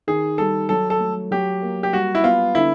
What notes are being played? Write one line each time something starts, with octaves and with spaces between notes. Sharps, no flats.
D#3 G#4
G3 A4
F#3 A4
A4
A3
F#3 G4
A#3
G4
G3 F#4
E4
B3 F4
D3 E4